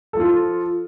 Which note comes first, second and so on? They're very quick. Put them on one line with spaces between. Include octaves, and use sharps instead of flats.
A4 F3 F4